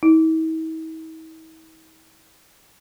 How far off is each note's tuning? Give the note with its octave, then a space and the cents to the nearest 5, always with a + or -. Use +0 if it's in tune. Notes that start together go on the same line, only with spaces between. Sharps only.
E4 -45